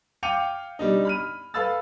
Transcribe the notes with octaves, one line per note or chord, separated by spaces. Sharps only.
F5 G5 D6 C#7 D#7 F7
B2 G3 D4 D#4
B5 F6 D#7
A4 B4 F5 B5 E6 A6